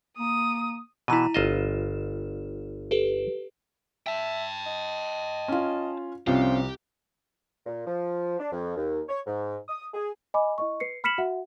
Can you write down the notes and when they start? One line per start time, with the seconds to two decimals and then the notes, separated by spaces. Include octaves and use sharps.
0.18 A#3 D#6
1.08 B2 E3 E4 A#5 D#7
1.34 G1 F4 D#5 E7
2.91 G4 A4 B4
4.07 E5 G5 A5
4.66 D#5
5.48 C#4 F4
6.27 C2 F3 C4 C#4 F4 G4
7.66 A#2
7.87 F3
8.39 D4
8.53 F2
8.77 D#2
9.09 C#5
9.27 G#2
9.69 D#6
9.94 G#4
10.34 D#5 G#5 B5 D6
10.58 E4 D#5 C#6
10.80 B4 C7 C#7
11.04 B5 F6 B6 C#7 E7 F#7
11.18 F#4 E5 F#5